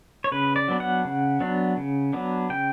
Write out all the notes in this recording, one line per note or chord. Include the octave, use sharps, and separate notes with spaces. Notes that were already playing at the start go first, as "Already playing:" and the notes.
C#5
C#3 B4
D5
F#3 B3 D4
F#5
C#3
F#3 B3 D4
C#3
F#3 B3 D4
C#3 G5